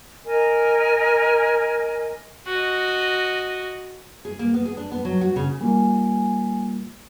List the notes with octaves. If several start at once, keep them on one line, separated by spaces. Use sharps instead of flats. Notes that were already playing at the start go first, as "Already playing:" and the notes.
A#4 D#5 G#5
F#4 D#5
G#4
A#3
B3
G#4
D4
B3
F#3
F#4
C#3
G3 A#3 F4 G#5